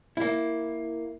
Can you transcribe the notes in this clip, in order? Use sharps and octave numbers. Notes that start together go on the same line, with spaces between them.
A#3 E4